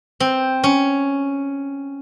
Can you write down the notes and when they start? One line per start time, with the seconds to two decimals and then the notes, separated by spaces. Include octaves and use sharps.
0.20 C4
0.64 C#4